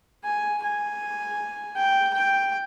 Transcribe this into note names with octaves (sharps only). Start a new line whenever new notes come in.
G#5
G#5
G5
G5